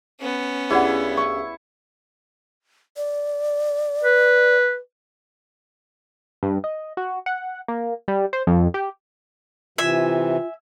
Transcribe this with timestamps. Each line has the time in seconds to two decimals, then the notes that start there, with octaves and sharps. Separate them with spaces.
0.20 B3 C#4
0.70 D2 C#3 G3 E4 G#4 D5 F#5
1.17 C#6
2.97 D5
4.04 B4
6.43 G2
6.64 D#5
6.97 F#4
7.26 F#5
7.68 A#3
8.08 G3
8.33 C5
8.47 F2
8.74 G4
9.78 C3 E3 F4 E5 G#5